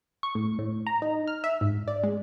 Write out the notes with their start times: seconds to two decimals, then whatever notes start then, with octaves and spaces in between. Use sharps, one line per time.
0.23 C#6
0.35 A2
0.59 A2
0.87 A#5
1.02 D#4
1.27 F6
1.44 E5
1.61 G#2
1.88 D5
2.03 G#3